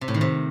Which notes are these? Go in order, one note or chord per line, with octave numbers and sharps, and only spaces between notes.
C3
A2
D#3
C3